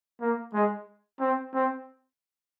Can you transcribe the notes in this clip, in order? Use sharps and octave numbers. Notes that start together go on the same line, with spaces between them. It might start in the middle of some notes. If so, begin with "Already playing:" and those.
A#3
G#3
C4
C4